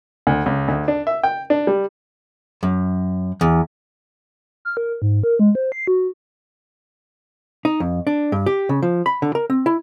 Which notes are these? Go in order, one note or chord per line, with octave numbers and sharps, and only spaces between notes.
D2
C#2
D2
D4
E5
G5
D4
G3
F#2
E2
F6
A#4
G#2
A#4
G#3
C5
C7
F#4
D#4
F2
D4
G2
G4
C#3
F3
B5
D3
A#4
C4
E4